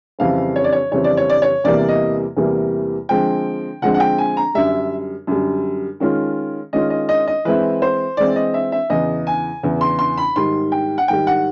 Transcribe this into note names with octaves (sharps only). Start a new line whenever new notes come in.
F2 C#3 E3 G3 C4 F5
C#5
D5
C#5
F2 C#3 E3 G3 C4 C#5
D5
C#5
D5
C#5
E2 C3 E3 G3 A#3 D5
D#5
E2 C3 E3 G3 A#3
D3 F3 G#3 C4 G5
D3 F3 G#3 C4 F#5
F#5
G5
G#5
A#5
F#2 D3 G3 E5
F#2 D3 G3
D#3 G#3 C#4 F4
D#3 G#3 C#4 F4 D#5
D#5
D#5
D#5
E3 G#3 C4 E4 B4
C5
E3 G#3 C4 E4 D5
D#5
E5
E5
E2 C#3 E3 D#5
G#5
E2 C#3 E3
C6
C6
B5
G#2 D#3 G3 C6
G5
F#5
G#2 D#3 G3 G5
F#5